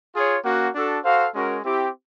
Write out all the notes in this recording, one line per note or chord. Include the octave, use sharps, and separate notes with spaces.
F4 G#4 C#5
A#3 C#4 F#4
D4 F#4 A4
F#4 A4 C5 F5
G#3 C#4 F#4 A#4
C4 E4 G4